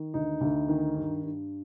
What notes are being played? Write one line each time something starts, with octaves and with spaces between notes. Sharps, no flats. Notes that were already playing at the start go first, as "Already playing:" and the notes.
Already playing: D#3
D2 D#4
D2
D#3
G2
G2